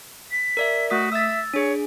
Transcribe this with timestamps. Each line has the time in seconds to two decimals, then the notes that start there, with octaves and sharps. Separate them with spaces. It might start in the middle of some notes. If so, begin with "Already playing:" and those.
0.31 B6
0.57 A#4 D5 E5
0.90 A3 F#4 D#6 B6
1.12 E5 E6 A6
1.54 D4 G#4 C#5